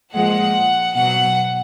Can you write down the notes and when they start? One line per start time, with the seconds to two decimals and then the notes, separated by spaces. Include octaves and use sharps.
0.13 A#2 F3 G#3 F#5
0.95 B2 F#3 F#5